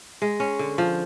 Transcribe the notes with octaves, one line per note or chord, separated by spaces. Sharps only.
G#3
C#4
D3
F3